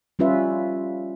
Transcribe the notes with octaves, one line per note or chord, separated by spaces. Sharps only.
G3 C#4 F4 B4 E5